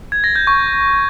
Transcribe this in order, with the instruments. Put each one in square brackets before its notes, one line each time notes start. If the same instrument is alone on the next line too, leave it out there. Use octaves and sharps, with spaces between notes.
[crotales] G#6
A#6
G6
C#6